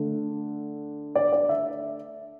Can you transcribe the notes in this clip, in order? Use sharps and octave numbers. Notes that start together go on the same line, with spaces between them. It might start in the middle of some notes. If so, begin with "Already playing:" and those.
Already playing: D3 A3
D5
D5
E5